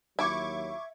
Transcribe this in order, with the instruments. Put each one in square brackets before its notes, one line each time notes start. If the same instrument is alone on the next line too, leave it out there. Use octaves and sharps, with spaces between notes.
[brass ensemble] D#2 F#3 [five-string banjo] E4 [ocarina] E5 [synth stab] C#6 D6 G#6